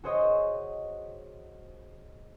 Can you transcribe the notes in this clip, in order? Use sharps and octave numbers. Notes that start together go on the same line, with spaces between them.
F#4 G#4 C5 C#5 D#5